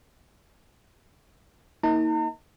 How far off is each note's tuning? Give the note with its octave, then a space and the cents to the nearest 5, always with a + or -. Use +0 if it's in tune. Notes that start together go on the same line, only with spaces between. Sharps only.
A#3 +0 D#4 +40 A#5 -45